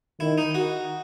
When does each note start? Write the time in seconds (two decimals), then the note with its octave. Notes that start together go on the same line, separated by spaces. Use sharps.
0.20 D#3 E4
0.38 D#4
0.55 F#4